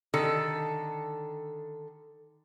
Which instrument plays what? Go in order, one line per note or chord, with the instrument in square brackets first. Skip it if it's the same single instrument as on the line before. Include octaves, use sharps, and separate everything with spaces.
[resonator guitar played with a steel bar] D3 D#3 A4 A5